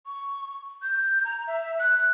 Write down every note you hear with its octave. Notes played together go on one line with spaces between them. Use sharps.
C#6
G6
A#5
E5
F#6